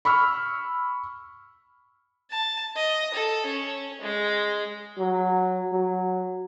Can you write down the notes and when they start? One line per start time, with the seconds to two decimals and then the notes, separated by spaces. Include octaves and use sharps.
0.05 B5 C#6 E6 F6
2.31 A5
2.76 D#5
3.14 A4
3.46 C#4
4.02 G#3
4.98 F#3
5.73 F#3